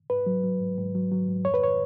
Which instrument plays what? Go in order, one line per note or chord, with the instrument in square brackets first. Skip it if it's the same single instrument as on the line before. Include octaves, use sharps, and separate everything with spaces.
[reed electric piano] G#2 B4
F#3
F#3
G#2
G#2
F#3
F#3
G#2
F2 C#5
B4
C#5